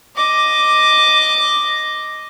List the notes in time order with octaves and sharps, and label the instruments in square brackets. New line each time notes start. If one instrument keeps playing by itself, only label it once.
[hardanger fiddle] D#5 D6